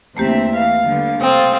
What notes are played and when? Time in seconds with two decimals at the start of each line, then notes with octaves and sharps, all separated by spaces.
0.17 E2 D3 A3 A#3 C4 G4 E5
0.54 E3 F5
0.85 D3 G3 B3
1.21 C3 C4 A4 F5 D#6